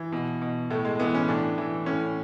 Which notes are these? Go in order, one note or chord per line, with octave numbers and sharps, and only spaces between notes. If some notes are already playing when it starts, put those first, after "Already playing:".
Already playing: E3
B2
B2
A2 A3
G#3
E3 B3
C#4
A2 D4
E3
A2 C#4